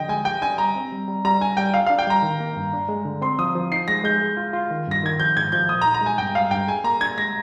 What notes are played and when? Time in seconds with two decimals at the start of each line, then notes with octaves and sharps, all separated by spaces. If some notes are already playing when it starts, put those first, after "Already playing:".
Already playing: D3 F3 D#5 G5
0.09 G#3 G#5
0.25 G4 G5
0.42 D4 G#5
0.58 G3 A#5
0.76 C4
0.92 G3
1.08 G3
1.25 G3 A#5
1.40 D4 G#5
1.57 G3 G5
1.74 F4 F5
1.86 D4 F5
1.99 G5
2.07 G3 A#5
2.23 D#3
2.40 A#3
2.56 G2
2.73 D4
2.89 G#3
3.05 D3
3.22 C4 C6
3.39 F3 D#6
3.56 F3
3.72 D#4 C7
3.88 G#3 A#6
4.04 G#3 G6
4.21 G#4
4.37 F4
4.53 F4
4.71 D#3
4.87 G2 A#6
5.03 D#3 G#6
5.20 F3 G6
5.36 G#2 G#6
5.52 F3 G6
5.69 A#2 D#6
5.82 A#5
5.86 D#4
5.94 A#5
6.02 G#3 G#5
6.18 G2 G5
6.35 G3 F5
6.51 G2 G5
6.67 G#4 G#5
6.84 A#3 A#5
7.01 D4 G#6
7.18 G#3 A#6